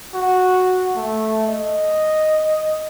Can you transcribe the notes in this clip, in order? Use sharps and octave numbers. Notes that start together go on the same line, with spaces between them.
F#4
A3
D#5